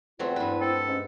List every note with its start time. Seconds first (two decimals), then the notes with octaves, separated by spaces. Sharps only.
0.19 E2 F#3 A3 C4 F4
0.36 G2 E4 B4
0.61 C4 A4
0.87 G#2 C#4